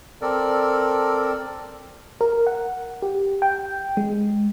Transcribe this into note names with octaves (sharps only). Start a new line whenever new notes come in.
C4 A4 A#4 D5
A#4
F#5
G4
G5
G#3